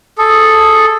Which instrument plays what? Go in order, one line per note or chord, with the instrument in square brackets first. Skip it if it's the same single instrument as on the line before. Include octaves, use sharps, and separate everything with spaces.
[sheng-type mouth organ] G#4 A4